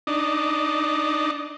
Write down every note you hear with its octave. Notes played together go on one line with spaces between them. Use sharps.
D4 D#4